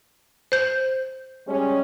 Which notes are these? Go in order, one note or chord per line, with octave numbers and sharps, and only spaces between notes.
C5 G6
G3 G#3 C#4